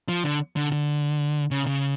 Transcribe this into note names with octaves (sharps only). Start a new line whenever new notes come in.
F3
D3
D3
D3
C#3
C#3